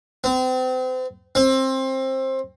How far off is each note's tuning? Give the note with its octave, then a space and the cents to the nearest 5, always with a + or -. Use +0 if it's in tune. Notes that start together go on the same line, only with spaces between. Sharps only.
C4 -35
C4 +20